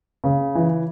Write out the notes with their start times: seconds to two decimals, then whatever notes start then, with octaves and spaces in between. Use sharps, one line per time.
0.24 C#3
0.55 E3